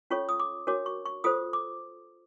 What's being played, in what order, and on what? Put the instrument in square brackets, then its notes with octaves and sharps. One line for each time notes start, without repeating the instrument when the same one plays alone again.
[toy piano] C#4 F4 A4 C#5 C#6
D#6
D6
D4 F#4 A#4 C#5 D6
C#6
C#6
F4 A4 C5 D#6
D6